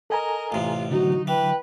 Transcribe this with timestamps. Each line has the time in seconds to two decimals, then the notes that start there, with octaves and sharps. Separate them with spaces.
0.10 A4 A#4 D#5 G#5 A#5
0.52 A1 C3 F4
0.91 D3 F#3 D#4 F#4
1.27 E3 B4 G5